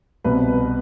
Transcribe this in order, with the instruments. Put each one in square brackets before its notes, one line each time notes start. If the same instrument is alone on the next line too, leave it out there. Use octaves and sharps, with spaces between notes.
[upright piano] C2 B2 B4